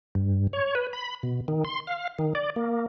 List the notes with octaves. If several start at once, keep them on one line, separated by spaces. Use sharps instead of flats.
G2
C#5
B4
B5
B2
D#3
C6
F5
D#3
D5
A#3